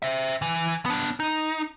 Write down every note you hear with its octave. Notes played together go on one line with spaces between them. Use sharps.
C5 E5
E3
B3 D4
D#4